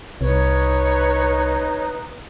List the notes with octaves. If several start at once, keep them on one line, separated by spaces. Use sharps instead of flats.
C2 D#4 B4 C#5